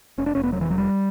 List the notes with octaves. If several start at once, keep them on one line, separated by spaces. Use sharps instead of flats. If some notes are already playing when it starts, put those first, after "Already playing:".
F1 C#4
D4
F1 C#4
B3
F2 F#3
E3
F1 F#3
G3